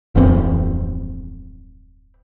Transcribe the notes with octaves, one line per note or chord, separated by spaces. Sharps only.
D1 F2 E3 C4